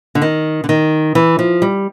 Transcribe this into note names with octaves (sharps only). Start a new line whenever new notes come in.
D3
D#3
D3
D#3
E3
F3
G3